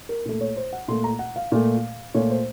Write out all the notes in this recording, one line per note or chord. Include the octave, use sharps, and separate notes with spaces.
A#4
A#2 A3
C#5
C5
F#5
A#2 A3 C6
A#5
F#5
F5
A#2 A3
A#2 A3 C#5
C5